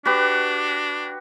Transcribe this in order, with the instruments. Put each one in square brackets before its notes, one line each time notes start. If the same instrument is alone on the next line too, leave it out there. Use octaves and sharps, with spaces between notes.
[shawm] D4 [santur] F#4 G4 B4